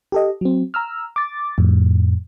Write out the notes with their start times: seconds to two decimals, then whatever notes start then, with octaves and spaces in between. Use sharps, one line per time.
0.12 G4 A4 D#5
0.41 F#3 C4
0.74 A#5 E6 F6
1.16 D6 A6
1.58 F2 A2